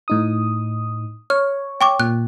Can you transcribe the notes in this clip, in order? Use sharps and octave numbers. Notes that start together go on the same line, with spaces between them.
A2 D#4 D#6
C#5 F6
G5 C#6 D6
A#2 F#6